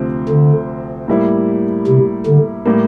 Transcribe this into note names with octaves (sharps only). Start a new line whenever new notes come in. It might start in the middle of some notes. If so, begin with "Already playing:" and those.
Already playing: D2 C3 F3 C4
D3
A2 G3 A#3 E4
C3
D3
A2 G3 A#3